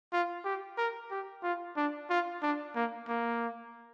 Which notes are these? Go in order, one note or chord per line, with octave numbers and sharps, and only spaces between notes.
F4
G4
A#4
G4
F4
D4
F4
D4
A#3
A#3